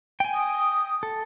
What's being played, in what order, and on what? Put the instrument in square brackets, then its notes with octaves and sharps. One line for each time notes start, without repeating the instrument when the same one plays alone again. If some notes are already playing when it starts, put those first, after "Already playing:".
[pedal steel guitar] G5 G#5
[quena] D#6
[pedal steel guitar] A4